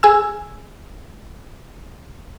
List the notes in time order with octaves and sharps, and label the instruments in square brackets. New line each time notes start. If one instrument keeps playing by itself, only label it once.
[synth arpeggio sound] G#4 G#5 E6